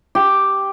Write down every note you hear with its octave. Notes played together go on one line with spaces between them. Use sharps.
G4